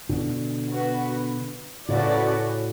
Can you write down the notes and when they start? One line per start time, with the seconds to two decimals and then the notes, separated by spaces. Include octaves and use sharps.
0.09 B2 D3
0.69 B3 F#4 B4
1.88 A2 C#3 A3 C#4 F#4 B4 D5